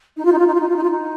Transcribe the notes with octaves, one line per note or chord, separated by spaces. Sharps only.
D#4
F4
D#4
F4
D#4
F4
D#4
F4
D#4
F4
D#4